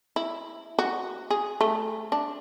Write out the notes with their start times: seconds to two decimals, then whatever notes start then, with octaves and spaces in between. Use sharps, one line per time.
0.16 E4
0.79 F#4
1.30 G#4
1.61 A3
2.12 D4